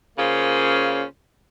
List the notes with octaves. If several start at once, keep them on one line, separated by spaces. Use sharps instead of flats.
C#3 A#3 C#4 F4 C5